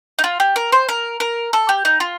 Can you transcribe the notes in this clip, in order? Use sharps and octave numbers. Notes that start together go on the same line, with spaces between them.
D#4
F4
G4
A#4
C5
A#4
A#4
A4
G4
D#4
F4